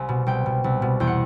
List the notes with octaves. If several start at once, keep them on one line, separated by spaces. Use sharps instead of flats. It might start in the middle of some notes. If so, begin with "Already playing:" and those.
Already playing: C2 G#5
B2
C2 G5
B2
C2
B2
E2 G5
F#5